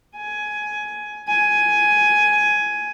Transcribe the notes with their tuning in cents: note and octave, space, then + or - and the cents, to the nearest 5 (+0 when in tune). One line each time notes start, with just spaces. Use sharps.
G#5 +15
G#5 +10